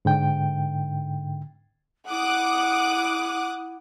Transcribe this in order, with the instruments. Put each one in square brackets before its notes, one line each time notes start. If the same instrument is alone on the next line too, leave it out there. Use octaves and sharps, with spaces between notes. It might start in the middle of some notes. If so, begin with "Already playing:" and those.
[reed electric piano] G#2 D3 G5
[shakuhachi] E4 [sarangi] F#5 [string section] D6 D#6 F#6